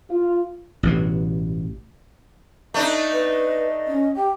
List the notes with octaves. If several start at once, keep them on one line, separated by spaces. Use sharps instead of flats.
F4
A1 G2 B2
A3 D4 D#4 D#5
B4
C#4
G4 G5